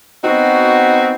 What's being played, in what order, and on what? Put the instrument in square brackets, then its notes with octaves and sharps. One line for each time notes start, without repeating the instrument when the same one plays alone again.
[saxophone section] B3 C4 D#4 F#4